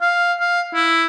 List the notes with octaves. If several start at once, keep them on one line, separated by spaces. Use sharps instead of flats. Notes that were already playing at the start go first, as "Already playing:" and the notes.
F5
F5
E4